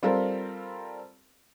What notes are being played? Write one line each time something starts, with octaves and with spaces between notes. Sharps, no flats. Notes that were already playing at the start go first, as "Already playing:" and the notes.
G3 C4 F4 A4 A#4 C5